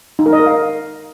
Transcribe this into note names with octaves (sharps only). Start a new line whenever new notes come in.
D#4
A#4
D#5
A#4
F5